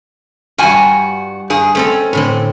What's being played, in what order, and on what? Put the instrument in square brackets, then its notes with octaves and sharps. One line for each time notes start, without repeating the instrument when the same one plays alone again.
[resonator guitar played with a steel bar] G2 F#4 G#5 [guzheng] G3 F4
[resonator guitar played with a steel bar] G2 G#4
[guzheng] A3 C4 A4 [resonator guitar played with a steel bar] C#4
[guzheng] A2 D3 C4